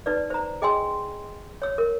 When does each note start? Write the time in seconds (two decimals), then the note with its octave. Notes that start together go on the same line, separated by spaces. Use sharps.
0.06 D#4 B4 D5
0.30 C5 A#5
0.62 G#4 D#5 G5 G#5 C6 E6
1.62 C#5 E6
1.78 A#4